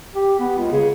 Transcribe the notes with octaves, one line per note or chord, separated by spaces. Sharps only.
G4
B3
C#2
C#3